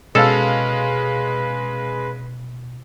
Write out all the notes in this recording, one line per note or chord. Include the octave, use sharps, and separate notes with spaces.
B2 G#3 C#4 A4 B4 F5